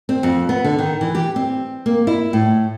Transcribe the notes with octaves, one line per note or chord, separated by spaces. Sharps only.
C4
F2
B3
D3
D#3
E3
G4
C4
A#3
E4
A2